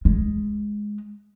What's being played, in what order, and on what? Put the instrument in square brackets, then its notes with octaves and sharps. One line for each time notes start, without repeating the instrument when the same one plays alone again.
[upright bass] G#3